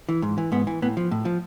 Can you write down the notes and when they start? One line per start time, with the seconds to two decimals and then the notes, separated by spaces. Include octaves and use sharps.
0.09 E3
0.22 G#2
0.38 E3
0.52 G#2 B3
0.67 E3
0.82 A2 B3
0.97 F3
1.11 A2
1.25 F3